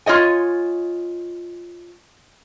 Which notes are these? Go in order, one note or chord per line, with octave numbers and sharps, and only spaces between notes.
F4 C#5 D#5 G#5